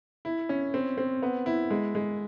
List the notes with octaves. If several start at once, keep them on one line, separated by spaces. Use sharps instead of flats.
E4
C#4
C4
C4
B3
E4
G#3
G#3